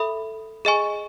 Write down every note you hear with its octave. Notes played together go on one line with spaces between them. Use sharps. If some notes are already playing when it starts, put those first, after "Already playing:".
Already playing: A4 E5 B5 D#6
G#4 D#5 G#5 C#6